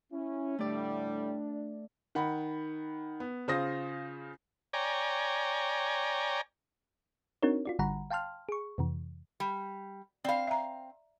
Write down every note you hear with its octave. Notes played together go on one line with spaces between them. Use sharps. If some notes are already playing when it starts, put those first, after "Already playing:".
C#4 E4
A2 D3 G3 A3 D4 D5
D#3 F#5 B5
B3
C#3 F4 C5 D#6 A#6
C#5 D5 G5 G#5 A#5
C4 D4 D#4 F#4 A#4 C#5
F4 F#4 D5
G#1 D3 G3 F#5 A#5 B5
F5 G5 A5 C6 F6
G#4 C#6
F2 C3 E3
G3
C4 D5 F5 B5
E5 A#5